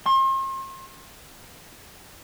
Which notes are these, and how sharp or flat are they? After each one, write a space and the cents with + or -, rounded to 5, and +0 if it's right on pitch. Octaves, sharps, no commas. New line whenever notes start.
C6 +40